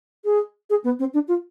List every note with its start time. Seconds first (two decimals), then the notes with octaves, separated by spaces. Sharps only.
0.25 G#4
0.70 G#4
0.84 B3
0.99 C4
1.14 D4
1.28 F4